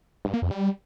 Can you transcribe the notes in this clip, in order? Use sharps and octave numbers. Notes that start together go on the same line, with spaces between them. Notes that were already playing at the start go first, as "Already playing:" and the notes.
G2
A#3
F2
G3